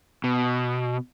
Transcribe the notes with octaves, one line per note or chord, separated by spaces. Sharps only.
B2